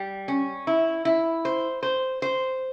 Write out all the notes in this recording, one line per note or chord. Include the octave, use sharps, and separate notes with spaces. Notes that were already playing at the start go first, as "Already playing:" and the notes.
Already playing: G3
C#4
E4
E4
C5
C5
C5